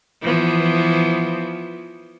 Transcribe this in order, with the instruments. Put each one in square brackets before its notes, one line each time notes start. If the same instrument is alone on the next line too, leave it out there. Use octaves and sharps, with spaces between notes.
[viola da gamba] E3 F3 B3